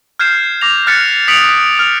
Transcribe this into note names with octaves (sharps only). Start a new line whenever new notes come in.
F6 G6 G#6 C7 E7
D6 A#6 F7
F6 F#6 A6 B6 C#7
D#6 B6 C#7 D7 F7 F#7
F6 F7